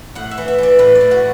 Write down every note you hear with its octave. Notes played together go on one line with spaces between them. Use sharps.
A2 F#5
E5
E3
E5
E3 D5
A2 B4
D5
A2
F#4